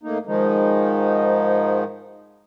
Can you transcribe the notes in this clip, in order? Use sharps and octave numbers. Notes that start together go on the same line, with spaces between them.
A2 A#3 D#4
G#2 D#3 F3 G#3 D#4